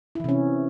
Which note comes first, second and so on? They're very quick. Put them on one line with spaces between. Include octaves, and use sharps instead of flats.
E4 E3 C3 C#4